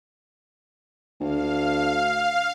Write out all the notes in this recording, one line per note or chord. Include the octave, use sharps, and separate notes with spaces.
D2 F5